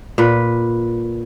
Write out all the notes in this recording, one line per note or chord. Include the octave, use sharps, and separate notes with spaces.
A#2 B4